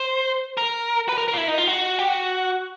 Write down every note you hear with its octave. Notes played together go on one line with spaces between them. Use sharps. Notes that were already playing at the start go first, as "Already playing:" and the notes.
Already playing: C5
A#4
B4
A#4
A#4
F4
E4
D#4
F4
F#4
G4
F#4